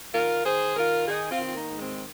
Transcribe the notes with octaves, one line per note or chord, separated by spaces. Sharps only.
D#3 F4 A#4
D#3 G#4 C5
D#3 F4 A#4
D#3 D#4 G#4
C4 F4
D#3
F4
A#3 D#4
G#2
G#3 C4